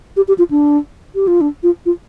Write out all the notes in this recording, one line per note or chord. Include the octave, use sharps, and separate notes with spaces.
G4
G4
F4
D4
G4
F4
D4
F4
F4